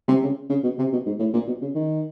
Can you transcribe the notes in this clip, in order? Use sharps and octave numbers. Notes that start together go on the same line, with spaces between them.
C3
C#3
C#3
B2
C3
B2
G#2
A2
A#2
B2
C#3
D#3